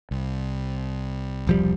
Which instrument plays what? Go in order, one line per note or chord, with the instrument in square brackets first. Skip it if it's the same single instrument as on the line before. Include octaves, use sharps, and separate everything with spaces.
[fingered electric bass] C2
[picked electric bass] E1 F3 G3